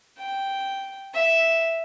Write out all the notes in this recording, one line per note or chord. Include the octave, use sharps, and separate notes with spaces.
G5
E5